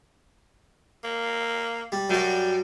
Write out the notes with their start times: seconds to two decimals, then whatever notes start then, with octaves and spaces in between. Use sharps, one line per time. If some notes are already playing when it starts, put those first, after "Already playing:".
1.04 A#3
1.92 G3
2.10 F#2 G3 F#4